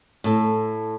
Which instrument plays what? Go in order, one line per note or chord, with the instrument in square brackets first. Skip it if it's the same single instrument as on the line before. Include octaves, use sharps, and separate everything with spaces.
[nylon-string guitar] A2 A4